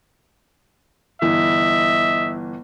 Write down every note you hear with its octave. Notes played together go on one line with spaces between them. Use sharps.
G1 E3 D#5 E5